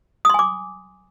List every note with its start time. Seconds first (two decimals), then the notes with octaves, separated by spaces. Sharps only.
0.25 D#6
0.30 C6
0.34 G#5
0.39 D6